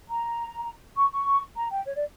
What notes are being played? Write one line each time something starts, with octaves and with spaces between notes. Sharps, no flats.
A#5
C#6
C#6
A#5
G5
C#5
D5